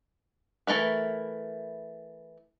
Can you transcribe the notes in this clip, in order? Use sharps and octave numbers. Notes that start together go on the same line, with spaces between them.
E3 A3 A#4 B4